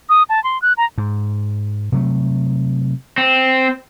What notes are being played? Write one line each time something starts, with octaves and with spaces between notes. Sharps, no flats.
D#6
A5
C6
F#6
A#5
G#2
C3 F#3 A3
C4